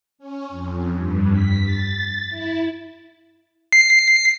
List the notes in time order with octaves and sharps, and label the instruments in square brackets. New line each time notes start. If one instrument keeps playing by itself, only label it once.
[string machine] C#4
F2
G2
B6
A6
E4
[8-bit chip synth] C7